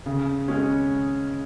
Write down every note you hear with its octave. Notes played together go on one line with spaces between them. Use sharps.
C#3
G#3 C#4